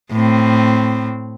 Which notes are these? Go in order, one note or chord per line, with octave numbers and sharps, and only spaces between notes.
A2 C4